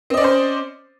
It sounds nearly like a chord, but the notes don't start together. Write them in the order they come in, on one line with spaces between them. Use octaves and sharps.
C4 D#5 D5 C#4 C5